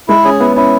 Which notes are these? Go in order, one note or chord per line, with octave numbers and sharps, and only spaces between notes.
G#3 E4
C#4 G#4
B3 E4
C#4 E4